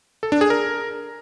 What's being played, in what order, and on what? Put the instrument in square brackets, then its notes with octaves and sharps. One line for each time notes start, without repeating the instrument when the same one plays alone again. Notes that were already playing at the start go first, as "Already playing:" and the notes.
[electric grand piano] A4
D4
G#4
A#4